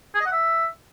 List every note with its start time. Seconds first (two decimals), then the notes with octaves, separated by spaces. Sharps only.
0.15 G#4
0.21 D#5
0.26 F#5
0.32 E5